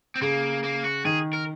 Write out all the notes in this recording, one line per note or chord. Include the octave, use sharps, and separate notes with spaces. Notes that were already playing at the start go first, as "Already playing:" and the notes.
C4
C#3 A#3
A#3
F#4
D#3 G#4
A#4